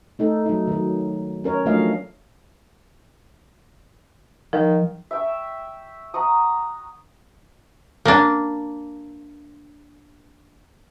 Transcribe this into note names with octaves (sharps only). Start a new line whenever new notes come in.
A3 D#4 A4
F#3 D#4
D#3 F#3
C#4 A#4 C#5
F3 F#3 A3 D4 D#5 F5
D#3 F3
E5 G5 C#6
F#5 A#5 C#6 D#6
A#3 D4